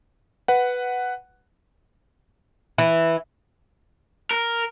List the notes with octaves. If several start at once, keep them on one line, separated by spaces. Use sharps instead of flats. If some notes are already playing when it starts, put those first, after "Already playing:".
B4 F#5
E3
A#4